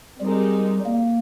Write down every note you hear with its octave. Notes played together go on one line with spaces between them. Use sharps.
G3 G#3 C4 D#4 G4 A#4
A#3